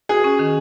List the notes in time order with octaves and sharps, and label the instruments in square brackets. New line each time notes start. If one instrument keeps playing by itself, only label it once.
[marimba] F#4 [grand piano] G#4
[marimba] C#4
D#3